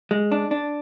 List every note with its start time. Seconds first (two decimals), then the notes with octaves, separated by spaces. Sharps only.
0.11 G#3
0.32 D4
0.51 D4